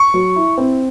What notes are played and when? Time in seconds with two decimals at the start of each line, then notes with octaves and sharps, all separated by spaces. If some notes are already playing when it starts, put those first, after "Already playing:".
Already playing: C#6
0.14 F#3
0.36 E4
0.58 C4